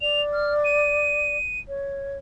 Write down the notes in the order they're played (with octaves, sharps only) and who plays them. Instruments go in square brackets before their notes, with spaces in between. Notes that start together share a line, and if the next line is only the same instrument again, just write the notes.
[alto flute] D5 [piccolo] F7
[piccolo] F6
D#7
[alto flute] C#5